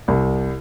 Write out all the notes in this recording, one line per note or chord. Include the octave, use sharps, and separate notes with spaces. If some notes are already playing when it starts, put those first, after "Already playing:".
C2